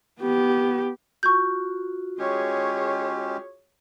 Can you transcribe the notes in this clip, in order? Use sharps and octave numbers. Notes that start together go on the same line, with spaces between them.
B3 G4
F4 F#4 C#6 G6
G#3 C#4 G4 G#4 C#5